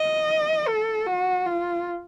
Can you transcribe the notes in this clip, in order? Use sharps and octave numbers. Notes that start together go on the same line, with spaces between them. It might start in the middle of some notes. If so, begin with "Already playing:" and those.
Already playing: D#5
A4
F#4
F4